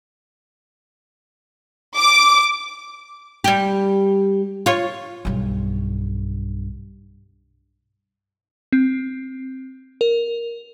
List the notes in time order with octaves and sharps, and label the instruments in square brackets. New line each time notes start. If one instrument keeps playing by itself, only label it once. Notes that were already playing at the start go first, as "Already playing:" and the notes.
[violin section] D6
[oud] G3 G4
F4 C#5
[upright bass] B1 G2
[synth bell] C4
A#4